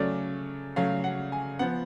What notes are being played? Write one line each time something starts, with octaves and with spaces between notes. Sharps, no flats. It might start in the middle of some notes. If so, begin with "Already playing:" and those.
Already playing: C#3 F#3 A3 C#4 D5
C#3 F#3 A3 C#4 F5
F#5
G#5
F3 B3 F#5